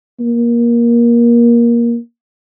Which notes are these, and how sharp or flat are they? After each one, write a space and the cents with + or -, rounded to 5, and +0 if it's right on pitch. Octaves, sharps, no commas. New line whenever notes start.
A#3 +20